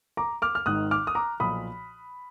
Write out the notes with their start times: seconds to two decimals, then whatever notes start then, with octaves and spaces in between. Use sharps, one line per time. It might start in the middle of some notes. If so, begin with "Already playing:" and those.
0.17 A#5 D6
0.42 D6 F6
0.55 F6
0.66 G#1 G#2 D#3 D#6 F#6
0.91 D6 F6
1.07 D#6
1.15 A#5 D6
1.40 B1 A#2 F3 B5 D#6